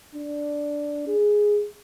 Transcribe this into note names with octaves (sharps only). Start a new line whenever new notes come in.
D4
G#4